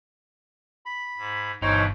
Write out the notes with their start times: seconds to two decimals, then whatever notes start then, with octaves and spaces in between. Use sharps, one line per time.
0.86 B5
1.18 G#2
1.62 G1 G2 B2 E3 D#4 C5 C#5 G5